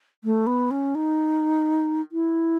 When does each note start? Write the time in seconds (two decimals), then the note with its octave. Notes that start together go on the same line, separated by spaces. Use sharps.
0.24 A3
0.47 B3
0.71 C#4
0.95 D#4
2.12 E4